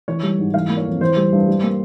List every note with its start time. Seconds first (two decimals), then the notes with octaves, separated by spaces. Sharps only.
0.08 E3 C#5
0.23 G3
0.39 G#2
0.54 E3 F5
0.69 A#3
0.77 C#5
0.86 F2
1.00 E3 C5
1.17 G3
1.32 G2
1.48 G3
1.63 A#3